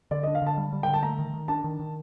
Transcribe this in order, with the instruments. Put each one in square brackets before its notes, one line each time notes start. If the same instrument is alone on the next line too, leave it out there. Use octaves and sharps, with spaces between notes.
[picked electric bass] D3 [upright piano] D5
[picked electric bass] D4 [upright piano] D#5
[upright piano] F5
[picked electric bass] D3 [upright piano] A5
[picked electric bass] G3
G3
[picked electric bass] D3 [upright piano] G5
[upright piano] A5
[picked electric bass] A3 [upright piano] A#5
[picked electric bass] D#3
D#3
[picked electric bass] D4 [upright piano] A5
[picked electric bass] D#3
D#3